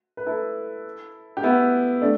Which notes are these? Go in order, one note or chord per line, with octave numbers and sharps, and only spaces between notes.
B4
E4 A4
G4
B3 E4
A3 D4